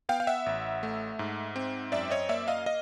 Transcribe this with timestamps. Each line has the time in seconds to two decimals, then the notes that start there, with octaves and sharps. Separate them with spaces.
0.09 B3 F5 G5
0.20 F5
0.27 E5 F#5
0.46 A1
0.83 A3
1.19 G#2
1.56 C4
1.92 F#2 D5 E5
2.11 C#5 D#5
2.29 A#3 D5 E5
2.48 D#5 F5
2.66 D#5 F5